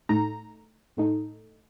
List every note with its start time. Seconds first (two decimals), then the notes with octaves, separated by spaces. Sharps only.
0.09 A2 A3 D#4 A#5
0.97 A2 A3 D#4